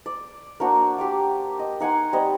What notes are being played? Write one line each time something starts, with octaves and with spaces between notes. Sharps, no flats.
D5
A#3 D4 F#4 C5
G4 C6 D6
D#5
D#4 F#5 G#5 C6
G3 C4 D#5